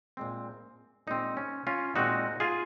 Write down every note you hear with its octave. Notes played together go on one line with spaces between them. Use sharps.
A#2 G#3 C4
A#2 G#3 C4 D#4
C#4
C#4 F4
A#2 G#3 C4 D#4 F#4
F4 G#4